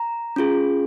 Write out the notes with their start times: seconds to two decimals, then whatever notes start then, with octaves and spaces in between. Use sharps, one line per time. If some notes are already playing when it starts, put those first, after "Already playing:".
Already playing: A#5
0.36 C#4 F4 G#4